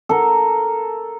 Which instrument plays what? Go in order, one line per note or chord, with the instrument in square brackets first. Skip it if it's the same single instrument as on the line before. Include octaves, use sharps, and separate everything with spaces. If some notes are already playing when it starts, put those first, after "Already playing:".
[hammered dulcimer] A4 A#4